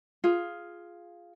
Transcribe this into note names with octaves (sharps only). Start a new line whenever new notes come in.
F4 G#4